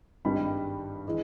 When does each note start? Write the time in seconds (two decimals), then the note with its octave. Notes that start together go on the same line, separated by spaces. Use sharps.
0.25 G#1 G2 D#3 G3 B5
1.08 E3 G#3